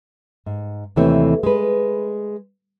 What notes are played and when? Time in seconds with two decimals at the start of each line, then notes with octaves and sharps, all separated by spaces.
0.46 G#2
0.96 D#2 C3 E3 A3 C4 C#5
1.43 G#3 B4